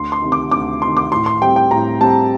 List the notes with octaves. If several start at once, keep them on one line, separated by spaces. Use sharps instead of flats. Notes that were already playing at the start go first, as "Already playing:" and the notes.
Already playing: D2 C6
C6
C3 D#3
D6
D2 D6
C3 D#3 C6
D6
A2 C6
C6
G3 C4 G5
G5
A2 A#5
G3 C4 A5